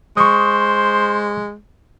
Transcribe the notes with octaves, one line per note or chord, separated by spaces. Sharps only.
G#3 C5 C#6 D#6